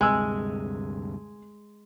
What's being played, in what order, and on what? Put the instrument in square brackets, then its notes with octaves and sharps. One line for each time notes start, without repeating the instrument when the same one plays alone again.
[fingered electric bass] D2 G2 C3 [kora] G#3 [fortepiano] G#5 E6